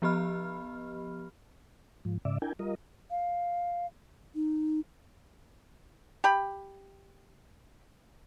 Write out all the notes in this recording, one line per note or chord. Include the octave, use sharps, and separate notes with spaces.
F3 B3 G4 D#5 B5 F6
G#2 F3
G#2 C#3 D5 E5
D4 E4 A#4 G5 G#5
G3 F4 A#4 D#5
F5
D#4
G4 B5